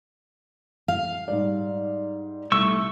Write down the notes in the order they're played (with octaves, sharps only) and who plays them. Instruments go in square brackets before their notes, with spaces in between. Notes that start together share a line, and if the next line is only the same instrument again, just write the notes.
[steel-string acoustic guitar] F5
[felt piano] G#2 G3 D5
[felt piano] C2 [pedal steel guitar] A3 C#6 E6